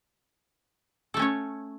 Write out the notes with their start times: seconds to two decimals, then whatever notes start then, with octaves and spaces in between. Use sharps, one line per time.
1.14 A4
1.17 A3
1.19 C#4
1.22 C#5